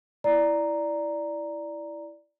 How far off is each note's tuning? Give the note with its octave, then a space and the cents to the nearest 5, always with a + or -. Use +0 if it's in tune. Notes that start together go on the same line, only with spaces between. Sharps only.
E4 +0 D5 +0 A#5 +0